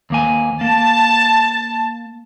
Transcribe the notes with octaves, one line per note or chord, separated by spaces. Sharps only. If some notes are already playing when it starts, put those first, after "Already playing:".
D#2 A#3 G#5
A#3 A5